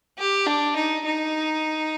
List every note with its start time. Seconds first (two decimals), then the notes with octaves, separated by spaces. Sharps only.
0.19 G4
0.47 D4
0.76 D#4
1.05 D#4